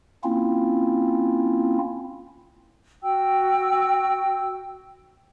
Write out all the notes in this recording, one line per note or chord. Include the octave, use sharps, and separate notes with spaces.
A#3 C4 C#4 E4 F4
F#4 G5 E6